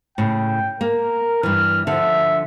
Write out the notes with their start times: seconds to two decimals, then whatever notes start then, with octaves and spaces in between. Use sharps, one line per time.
0.18 A2 C#3 G5
0.81 A#3 A#4
1.43 G2 E3 F6
1.87 D3 F3 E5